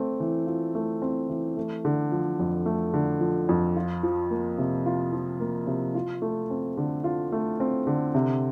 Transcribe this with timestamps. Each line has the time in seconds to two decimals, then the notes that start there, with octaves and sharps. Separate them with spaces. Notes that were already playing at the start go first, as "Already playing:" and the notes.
Already playing: A3 C4
0.20 E3
0.47 F4
0.75 A3
1.02 C4
1.29 E3
1.57 A3
1.85 D3
2.12 F3
2.39 F2
2.66 A3
2.94 D3
3.21 F3
3.49 F2
3.76 F4
4.03 F3
4.31 A#3
4.58 C3
4.86 F4
5.13 F3
5.40 A#3
5.67 C3
5.95 F4
6.22 A3
6.50 C4
6.77 D3
7.04 F4
7.32 A3
7.60 C4
7.87 D3
8.15 C3